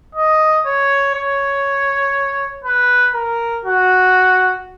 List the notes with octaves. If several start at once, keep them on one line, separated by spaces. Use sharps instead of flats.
D#5
C#5
C#5
B4
A#4
F#4